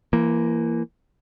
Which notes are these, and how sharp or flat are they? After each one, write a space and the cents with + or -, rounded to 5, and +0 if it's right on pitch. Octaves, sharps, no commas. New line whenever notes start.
E3 +30 A#3 +0